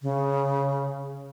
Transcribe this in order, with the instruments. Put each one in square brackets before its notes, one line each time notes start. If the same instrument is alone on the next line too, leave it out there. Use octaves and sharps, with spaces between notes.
[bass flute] C#3